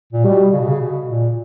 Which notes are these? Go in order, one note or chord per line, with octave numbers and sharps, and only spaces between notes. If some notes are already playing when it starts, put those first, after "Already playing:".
A#2
B2 G3
C#3
B2
C#3
B2
A#2